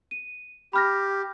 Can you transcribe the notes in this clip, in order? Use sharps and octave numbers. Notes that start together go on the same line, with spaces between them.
D#7
G4 B5 F6 A#6